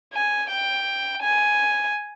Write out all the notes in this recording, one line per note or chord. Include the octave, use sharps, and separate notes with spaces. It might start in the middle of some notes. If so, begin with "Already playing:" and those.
G#5
G5
G#5